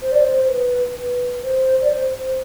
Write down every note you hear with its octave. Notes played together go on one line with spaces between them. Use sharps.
C5
D5
C5
C5
B4
B4
C5
D5
C5
C5